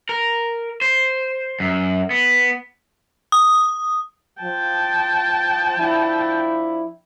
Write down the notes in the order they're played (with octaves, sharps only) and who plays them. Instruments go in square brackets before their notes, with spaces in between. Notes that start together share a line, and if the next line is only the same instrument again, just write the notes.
[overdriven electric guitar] A#4
C5
F#2
B3
[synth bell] D#6
[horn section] F3 [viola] G5 A5
[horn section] F3 D4 E4